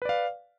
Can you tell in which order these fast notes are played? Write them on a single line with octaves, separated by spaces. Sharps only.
B4 D5 F5